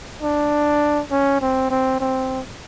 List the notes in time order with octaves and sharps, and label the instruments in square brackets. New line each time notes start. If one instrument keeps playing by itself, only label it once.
[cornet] D4
C#4
C4
C4
C4